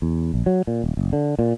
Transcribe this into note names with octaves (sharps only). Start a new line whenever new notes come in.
E2
A#1
F#3
A#2
D#1
F#1
D3
A#2